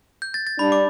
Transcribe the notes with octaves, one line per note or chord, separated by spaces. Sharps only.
G6
A6
A6
G3 D4 B5
D6